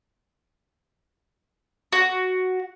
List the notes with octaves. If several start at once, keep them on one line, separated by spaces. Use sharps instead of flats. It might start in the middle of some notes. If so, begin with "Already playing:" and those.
F#4